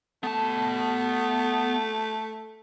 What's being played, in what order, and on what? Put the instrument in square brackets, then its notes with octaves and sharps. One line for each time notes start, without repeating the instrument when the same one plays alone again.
[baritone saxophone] A3 [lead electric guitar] B3 A5